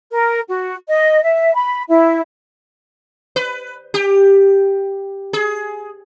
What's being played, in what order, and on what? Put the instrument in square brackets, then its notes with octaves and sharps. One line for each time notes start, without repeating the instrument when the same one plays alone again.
[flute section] A#4
F#4
D#5
E5
B5
E4
[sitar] B4
G4
G#4